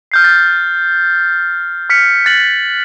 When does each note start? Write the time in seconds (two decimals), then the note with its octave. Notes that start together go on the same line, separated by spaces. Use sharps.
0.12 F6 G6 C7
0.24 A6
1.90 F6 B6 C#7
2.25 F#6 A6 F#7